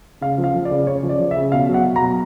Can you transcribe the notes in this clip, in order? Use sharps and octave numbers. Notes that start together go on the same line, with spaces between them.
C#3 F5
F3
F5
F3
D5
C#3
C#3 C#5
F3
D5
F3
E5
C#3
B2 F5
F#3
F#5
F#3
A#5
B2